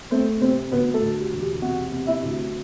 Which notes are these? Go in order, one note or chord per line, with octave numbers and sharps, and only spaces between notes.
A3 C4 C5
C3 C4 C5
D2 B3 B4
A3 A4
D2
G4
E1
G4
C3 F#4 F#5
C3
E4 E5
D2